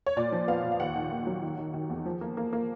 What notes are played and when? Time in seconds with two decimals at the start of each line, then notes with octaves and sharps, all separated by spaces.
0.06 C#5
0.17 A#2 D5
0.32 F3
0.48 B3 F5
0.64 A#2
0.72 F5
0.79 D#2 F#5
0.96 D#3
1.11 D#2
1.27 F#3
1.43 D#3
1.58 D#3
1.74 D#3
1.90 E2
2.06 F3
2.21 A#3
2.37 A#3
2.53 A#3